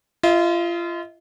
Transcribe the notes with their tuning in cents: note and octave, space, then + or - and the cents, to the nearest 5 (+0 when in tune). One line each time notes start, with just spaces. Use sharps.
F4 -30 D#5 +35